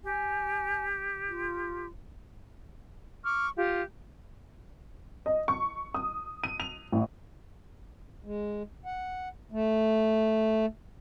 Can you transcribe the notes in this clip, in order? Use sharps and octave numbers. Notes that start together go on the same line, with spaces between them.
G4 G#5
F4
C#6 D6 F6
F4 G4
D#5
C#6
D#6
D#7
F7
A1
G#3
F#5
A3